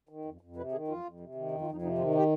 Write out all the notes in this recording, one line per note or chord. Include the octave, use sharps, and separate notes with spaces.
D#3
F2
F2
C3 B4
D#3 G#4
F2 F4
F2
C3
D#3
F2 D#4
F4
F2 D#4
C3 D#4
D#3 F4
G4